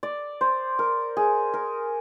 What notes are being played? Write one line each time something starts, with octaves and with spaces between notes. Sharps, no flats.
D5
C5
A#4
G#4
A#4